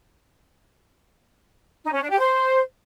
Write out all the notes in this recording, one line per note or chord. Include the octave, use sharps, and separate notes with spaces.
D#4
C#4
D4
G4
C5